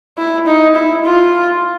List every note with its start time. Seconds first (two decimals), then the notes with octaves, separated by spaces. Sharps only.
0.18 E4
0.46 D#4
0.75 E4
1.04 F4